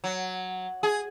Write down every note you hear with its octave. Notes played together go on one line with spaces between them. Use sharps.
F#3
G#4